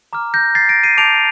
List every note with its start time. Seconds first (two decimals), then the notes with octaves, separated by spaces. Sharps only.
0.13 A#5 D6 F6
0.34 G6 A#6
0.55 A6 C7
0.69 A#6 D7
0.83 C7 D#7
0.97 A5 D6 G6 D7 F7